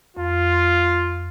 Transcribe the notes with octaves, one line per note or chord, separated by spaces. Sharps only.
F2 F4